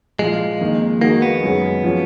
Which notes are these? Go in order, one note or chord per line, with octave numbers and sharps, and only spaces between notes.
A#2 F3 G#3 A#3 F4
F2 D#3 A#3
D#3 G#3 A#3 D#4 F#4
B3
F#2 C#3 G#3 C#4
F3 G#3 C#4 F#4